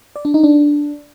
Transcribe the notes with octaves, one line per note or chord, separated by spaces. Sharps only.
D5
D4
D#4
D4